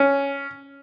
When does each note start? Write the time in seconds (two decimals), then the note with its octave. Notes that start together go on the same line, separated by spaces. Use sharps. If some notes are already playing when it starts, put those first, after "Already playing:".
Already playing: C#4